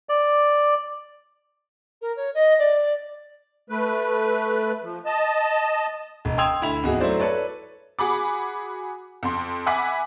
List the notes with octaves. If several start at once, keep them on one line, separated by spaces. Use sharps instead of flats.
D5
A#4
C#5
D#5
D5
A3 B4
F3
D#5 A5
E1
G5 C6 D#6 E6 G#6 F7
D2 E4 B5 F7
G#1 E2 F#4 G#4
F#3 A3 E4 C5 D5
A4 B4 C#5 D5
F#4 G#4 B5 D6
F2 C6
E5 F#5 G#5 B5 D6 B6